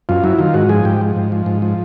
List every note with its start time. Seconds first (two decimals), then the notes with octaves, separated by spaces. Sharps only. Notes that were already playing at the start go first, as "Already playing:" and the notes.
0.09 F#2 F4
0.24 F#3 E4
0.39 D#3 F4
0.54 G#2 F#4
0.69 F3 G#4
0.85 G#2 G4
1.01 F3
1.16 G#2
1.32 F3
1.46 G#2
1.62 F3